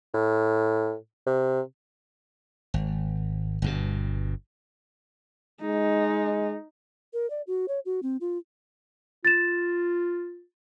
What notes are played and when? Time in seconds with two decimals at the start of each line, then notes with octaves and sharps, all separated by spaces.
0.14 A2
1.27 C3
2.74 G#1
3.62 G1 G2 B2
5.62 G#3 D#4
7.13 A#4
7.30 D5
7.47 F#4
7.68 C#5
7.85 F#4
8.03 C4
8.21 F4
9.25 F4 A6 E7